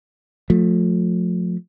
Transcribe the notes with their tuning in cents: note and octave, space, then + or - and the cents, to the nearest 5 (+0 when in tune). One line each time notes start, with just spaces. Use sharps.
F3 +35 A3 +0